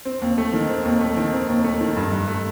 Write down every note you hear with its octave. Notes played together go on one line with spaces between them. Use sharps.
C4
D#2
A3
D#3
C4
D#2
A3
D#3
C4
D#2
A3
D#3
G2
G2
A3